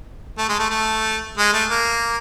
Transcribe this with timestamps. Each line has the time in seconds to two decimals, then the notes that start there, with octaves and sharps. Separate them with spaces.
0.38 A3
0.49 G#3
0.59 A3
0.70 A3
1.38 G#3
1.53 A3
1.70 A#3